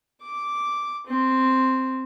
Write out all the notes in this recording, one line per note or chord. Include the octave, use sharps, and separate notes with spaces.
D6
C4